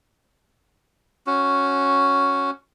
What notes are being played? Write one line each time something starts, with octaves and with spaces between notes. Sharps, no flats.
C#4 F#4